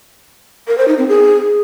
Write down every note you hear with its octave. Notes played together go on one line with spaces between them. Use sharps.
A#4
C5
D#4
C4
G#4